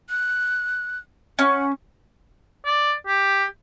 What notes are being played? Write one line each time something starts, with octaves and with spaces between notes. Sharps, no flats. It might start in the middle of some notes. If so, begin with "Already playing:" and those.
F#6
C#4 F#5
D5
G4